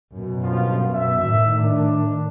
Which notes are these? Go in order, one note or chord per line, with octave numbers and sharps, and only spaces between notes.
F#2 B2
G1 F3 F4
E5
A2 D#3
D4